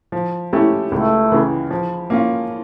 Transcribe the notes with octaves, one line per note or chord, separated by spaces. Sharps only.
F3
A3 C#4 E4 G4
C#2 A3
C#3 E3
F3
A#3 C#4 F4